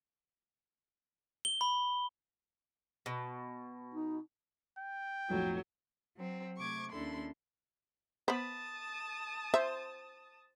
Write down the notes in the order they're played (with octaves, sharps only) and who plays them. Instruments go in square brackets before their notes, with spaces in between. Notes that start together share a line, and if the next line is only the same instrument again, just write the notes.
[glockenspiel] G7
B5
[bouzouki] B2
[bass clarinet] D#4
[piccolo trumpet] G5
[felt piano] B1 F2 A2 [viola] F#3
[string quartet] F#3 C4
C3 A3 C#6 D6 G#6
D#2 C#4 D4 E4 A4 C6
[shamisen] B3 C5 [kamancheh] A5 D#6 [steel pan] B5
[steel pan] C5 [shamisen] E5